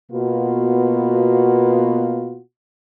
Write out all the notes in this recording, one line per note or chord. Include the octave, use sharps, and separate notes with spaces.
B2 A#3 B3 F4 F#4